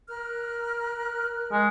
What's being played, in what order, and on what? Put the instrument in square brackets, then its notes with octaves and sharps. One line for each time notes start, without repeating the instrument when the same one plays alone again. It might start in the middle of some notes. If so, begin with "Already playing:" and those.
[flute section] A#4 F6 F#6
[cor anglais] G#3